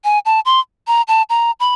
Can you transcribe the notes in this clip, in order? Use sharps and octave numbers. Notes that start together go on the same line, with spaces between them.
G#5
A5
C6
A#5
A5
A#5
B5